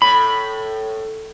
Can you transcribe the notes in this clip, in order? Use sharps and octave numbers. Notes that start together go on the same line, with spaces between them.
A2 B5